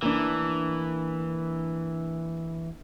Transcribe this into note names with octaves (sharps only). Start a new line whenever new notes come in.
E3 A#3 D4